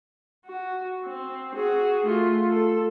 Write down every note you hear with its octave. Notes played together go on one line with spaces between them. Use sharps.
F#4
C4
F#4 G#4
A3 F4
A4